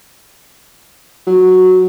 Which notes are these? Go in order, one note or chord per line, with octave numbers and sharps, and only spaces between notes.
F#3